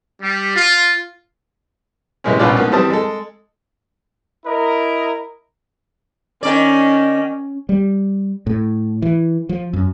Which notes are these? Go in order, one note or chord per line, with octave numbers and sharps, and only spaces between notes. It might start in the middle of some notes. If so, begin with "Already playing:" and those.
G3
F4
C3 E3 G#3 A#3 C#4
A#1 B2 C#4 F4 D5
G#2 F3 A#3 B3
E3 G3 C4 A5 D#6
G#3 A4
E4 A#4 D#5
D#3 C#4 D5
G3
A2
E3
F3
F#2